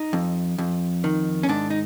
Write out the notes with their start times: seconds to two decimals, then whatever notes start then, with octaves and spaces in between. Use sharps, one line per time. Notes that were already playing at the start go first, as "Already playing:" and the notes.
Already playing: D#4
0.13 F2
0.58 F2
1.04 D#3
1.43 C#4
1.49 G#2 D4
1.70 D#4